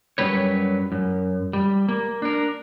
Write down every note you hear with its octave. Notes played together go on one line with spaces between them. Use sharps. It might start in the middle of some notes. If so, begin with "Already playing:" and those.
F#2 D#3 F#3 G3 B4 C#5
F#2
G3
A#3
D4 A#4